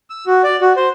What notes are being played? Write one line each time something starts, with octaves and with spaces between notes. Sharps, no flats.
E6
F#4
D5
F#4
C5